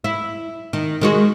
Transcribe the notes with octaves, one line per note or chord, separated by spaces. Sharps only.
E4
D#3
D#3 G#3 F#4